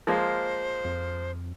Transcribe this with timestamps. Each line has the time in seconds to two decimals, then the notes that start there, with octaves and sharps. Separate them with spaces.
0.07 F3 G#3 A#3 C5
0.85 F2